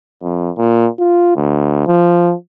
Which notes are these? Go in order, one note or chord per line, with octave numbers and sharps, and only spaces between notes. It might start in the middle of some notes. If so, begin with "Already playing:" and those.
F2
A#2
F4
D2
F3